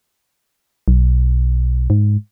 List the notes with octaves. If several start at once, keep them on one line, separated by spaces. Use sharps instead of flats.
B1
G#2